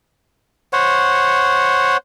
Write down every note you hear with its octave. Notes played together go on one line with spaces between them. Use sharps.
C5 C#5 F#5